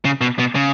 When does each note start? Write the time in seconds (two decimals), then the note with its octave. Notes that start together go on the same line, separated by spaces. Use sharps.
0.05 C#3
0.21 B2
0.39 B2
0.55 C#3